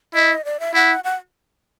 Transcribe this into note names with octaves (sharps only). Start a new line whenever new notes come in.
E4 D#5
D5
E5
E4 F#5
F#5